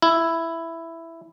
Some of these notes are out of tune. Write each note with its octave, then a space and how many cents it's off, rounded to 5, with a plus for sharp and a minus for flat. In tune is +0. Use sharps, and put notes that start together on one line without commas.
E4 +5